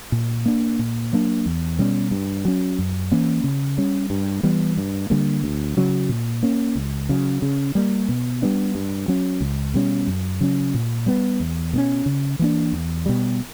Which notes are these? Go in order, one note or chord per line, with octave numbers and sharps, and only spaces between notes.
A#2
A#3 D4
A#2
F#3 A#3 D4
E2
B2 G3 C#4
G2
F#3 C#4
F#2
E3 A#3 C#4
C#3
G3 C#4
G2
E3 G3 B3
G2
D3 G3 A#3
D2
C#3 F#3 C#4
A#2
A#3 C#4
C#2
C#3 F#3
C#3
G3 A#3
B2
G3 B3 D4
G2
F#3 C#4
C#2
B2 G3 C#4
F#2
C#3 F#3 C#4
A#2
G3 B3
E2
B2 A#3 C#4
C#3
E3 A#3 D4
E2
B2 G3